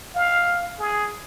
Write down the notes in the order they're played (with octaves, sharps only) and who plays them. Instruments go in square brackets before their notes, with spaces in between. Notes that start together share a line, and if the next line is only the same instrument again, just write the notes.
[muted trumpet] F5
G#4